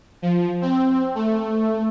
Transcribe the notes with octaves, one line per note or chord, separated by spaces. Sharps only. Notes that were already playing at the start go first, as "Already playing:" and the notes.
F3
C4
A3